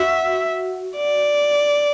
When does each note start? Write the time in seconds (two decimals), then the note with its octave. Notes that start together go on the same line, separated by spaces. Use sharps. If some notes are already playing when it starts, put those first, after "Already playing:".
Already playing: F#4 E5
0.97 D5